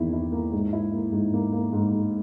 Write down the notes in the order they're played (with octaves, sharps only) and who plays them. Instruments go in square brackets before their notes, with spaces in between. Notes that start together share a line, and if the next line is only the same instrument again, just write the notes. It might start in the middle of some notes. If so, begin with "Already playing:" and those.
Already playing: [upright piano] E2 D#3 A#3 E4
E4
A#3
G#2
E4
A#3
G#2
A#3
A#3
G#2
G#2